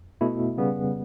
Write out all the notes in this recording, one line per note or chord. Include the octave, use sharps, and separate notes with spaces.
B2 A3 E4
C#3 G3 B3